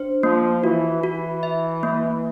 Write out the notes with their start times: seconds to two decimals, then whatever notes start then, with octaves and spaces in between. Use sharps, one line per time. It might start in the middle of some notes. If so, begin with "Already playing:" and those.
Already playing: D4 C5
0.23 F3 A#3
0.64 E3 F#4
1.03 E3 F#4
1.43 E5
1.83 A#3